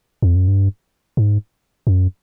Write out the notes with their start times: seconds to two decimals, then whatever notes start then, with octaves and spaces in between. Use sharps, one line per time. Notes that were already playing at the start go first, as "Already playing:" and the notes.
0.22 F2
0.36 F#2
0.48 G2
1.17 G#2
1.87 F#2